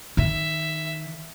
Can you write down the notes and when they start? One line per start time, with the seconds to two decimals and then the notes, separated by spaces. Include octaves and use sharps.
0.17 D#3 E5